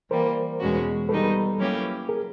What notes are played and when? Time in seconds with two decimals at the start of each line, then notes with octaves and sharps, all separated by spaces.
0.10 E3 G3 A#3 A#4 C5
0.60 E2 B2 G#3 C#4 F#4
1.09 D#3 G3 B3 D#4 A4 B4
1.59 F#3 A#3 C#4 E4 G4
2.09 G#4 A#4